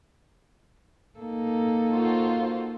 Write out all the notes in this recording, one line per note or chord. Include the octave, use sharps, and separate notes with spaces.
A#3 D#4 A4
F4 F#4 C5